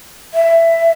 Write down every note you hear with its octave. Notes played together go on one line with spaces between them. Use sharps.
E5